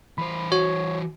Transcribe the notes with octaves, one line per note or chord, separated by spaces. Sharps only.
E3 C5 B5
F#4 C#5